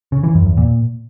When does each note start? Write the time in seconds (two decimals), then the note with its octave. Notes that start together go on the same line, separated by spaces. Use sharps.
0.12 C#3
0.23 E3
0.35 F#2
0.46 E2
0.57 A#2